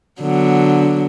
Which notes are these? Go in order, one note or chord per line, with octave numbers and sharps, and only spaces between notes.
D3 F#3 B3